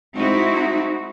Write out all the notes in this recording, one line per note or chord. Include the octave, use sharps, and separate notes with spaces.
G#3 C4 D#4 E4 F#4